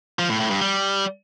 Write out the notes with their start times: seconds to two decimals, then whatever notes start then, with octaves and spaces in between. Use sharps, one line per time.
0.19 F3
0.29 A2
0.40 A2
0.50 G2
0.61 G3